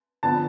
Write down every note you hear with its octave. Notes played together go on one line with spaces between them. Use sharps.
D3 F3 B3 A5